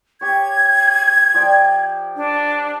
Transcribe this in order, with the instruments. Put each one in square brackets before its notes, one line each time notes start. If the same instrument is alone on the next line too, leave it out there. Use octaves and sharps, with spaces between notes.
[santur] G4 C#5 [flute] G#6
[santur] F3 D5 G5
[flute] D4